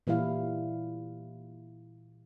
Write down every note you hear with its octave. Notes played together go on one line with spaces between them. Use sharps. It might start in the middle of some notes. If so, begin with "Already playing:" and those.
A#2 E3 G3 E4 F5